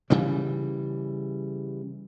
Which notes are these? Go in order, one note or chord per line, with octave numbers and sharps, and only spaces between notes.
C#3 E3 G3